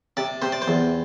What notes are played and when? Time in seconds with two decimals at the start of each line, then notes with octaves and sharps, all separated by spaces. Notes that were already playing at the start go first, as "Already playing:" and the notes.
0.17 C3 D5
0.42 C3 C5
0.52 D5
0.62 C5
0.68 E2